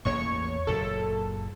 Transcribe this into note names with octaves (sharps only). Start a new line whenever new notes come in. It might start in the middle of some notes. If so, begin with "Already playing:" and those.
A1 E2 A#3 C#5 C#6
F#1 A#2 A4